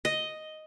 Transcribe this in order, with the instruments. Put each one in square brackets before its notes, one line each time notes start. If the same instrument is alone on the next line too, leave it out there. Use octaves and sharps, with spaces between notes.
[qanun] D#5